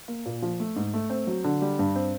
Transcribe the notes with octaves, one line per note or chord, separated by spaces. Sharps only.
A#3
A#2
F3
A3
G#2
A3
C4
F#3
D3
G3
G2
C4